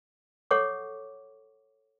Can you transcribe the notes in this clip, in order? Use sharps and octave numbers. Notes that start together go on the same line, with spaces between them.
A4 C#5 F#5 C#6 D6